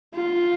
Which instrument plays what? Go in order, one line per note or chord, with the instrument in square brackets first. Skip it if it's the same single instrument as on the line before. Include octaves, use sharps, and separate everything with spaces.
[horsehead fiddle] F4